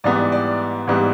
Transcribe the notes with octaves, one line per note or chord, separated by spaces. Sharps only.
G#2 E3 G3 B3 D5
D5
G#2 E3 G3 B3